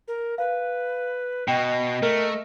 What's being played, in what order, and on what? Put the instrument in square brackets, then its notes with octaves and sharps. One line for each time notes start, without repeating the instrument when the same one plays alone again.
[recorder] A#4
[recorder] B4 [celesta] F5
[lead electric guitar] B2 [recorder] D#5 [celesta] G5
[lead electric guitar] A3 [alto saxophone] A#4